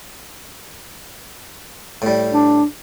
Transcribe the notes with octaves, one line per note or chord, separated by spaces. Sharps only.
A2 G3
D4